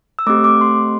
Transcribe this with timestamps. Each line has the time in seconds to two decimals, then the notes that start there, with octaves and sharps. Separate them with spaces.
0.19 E6
0.27 A3 C4 G4 D6
0.44 D6
0.61 C6